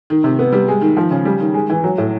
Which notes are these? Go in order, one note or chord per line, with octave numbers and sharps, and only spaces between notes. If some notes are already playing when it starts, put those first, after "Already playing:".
D#3
C3
B3
G3
G#3
D#3
F3
C#3
G3
D#3
G#3
E3
F#3
A2